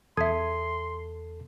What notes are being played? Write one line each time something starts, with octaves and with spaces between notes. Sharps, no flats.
E2 A4 E5 C6 D#6 G#6